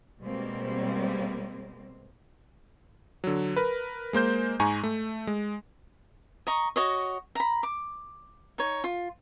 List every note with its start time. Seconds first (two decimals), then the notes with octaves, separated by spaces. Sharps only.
0.20 B2 G3 G#3 A#3 C4
3.24 D3 F#3
3.56 A#4 B4
4.13 G#3 A#3 C5 G6
4.60 G#2 G#3 G#5 A#5 C#6
4.83 A3
5.27 G#3
6.47 D#5 A#5 C#6
6.76 F#4 C#5 D#5
7.35 A#5 B5
7.63 D6
8.58 D#4 C#5
8.84 F4